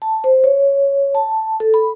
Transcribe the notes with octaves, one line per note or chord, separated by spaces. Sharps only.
A5
C5
C#5
A5
A4
B5